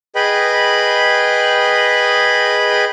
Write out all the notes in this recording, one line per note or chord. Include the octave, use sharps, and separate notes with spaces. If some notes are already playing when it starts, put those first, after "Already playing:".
G#4 B4 D#5 G5 B5